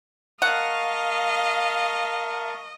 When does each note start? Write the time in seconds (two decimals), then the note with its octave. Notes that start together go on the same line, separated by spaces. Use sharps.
0.42 A#4 D#5 F5 F#5 A5 C#6